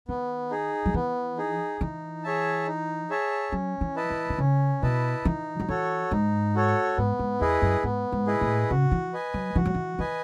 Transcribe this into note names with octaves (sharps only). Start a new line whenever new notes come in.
D#3 B3
D#4 G#4
F#3
E3 B3
D#4 G#4
E3 D#4
G#4 C#5 E5 A5
D#4
G#4 C#5 E5 A5
F#3 C#4
E3
E4 B4 D#5 A5
E3
D#3
C#3 C#4
B2 E4 B4 D#5 A5
E3 D#4
F#3
E3 F#4 A4 C#5
G#2 D#4
F#4 A4 C#5
G#2 B3
G#2
E2 E4 G#4 B4 D#5
F#2
G#2 B3
G#2
E4 G#4 B4 D#5
A2
C#3 F#4
E3
B4 D#5 G#5
F#3
E3 F#4
F#3
E3
E3 B4 D#5 G#5